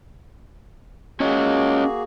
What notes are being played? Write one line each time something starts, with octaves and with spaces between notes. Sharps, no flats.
A#3 C#4 F#4 G#4 C#5 D#5